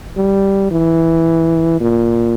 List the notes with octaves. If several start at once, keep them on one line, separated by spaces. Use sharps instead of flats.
G3
E3
A#2